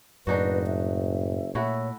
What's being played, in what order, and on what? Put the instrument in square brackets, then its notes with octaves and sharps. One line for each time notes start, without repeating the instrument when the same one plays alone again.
[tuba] F#1 [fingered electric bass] F#2 A2 [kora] D4 D#4 F#4 [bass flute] B4
[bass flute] E5
[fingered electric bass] A#2 [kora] A3 E4 F#4 [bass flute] C#5